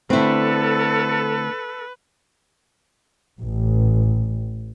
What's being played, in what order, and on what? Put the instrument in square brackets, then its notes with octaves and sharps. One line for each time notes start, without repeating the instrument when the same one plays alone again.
[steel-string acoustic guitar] D3 A3 [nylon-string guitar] C4 E4 [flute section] A4 [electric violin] B4
[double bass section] A1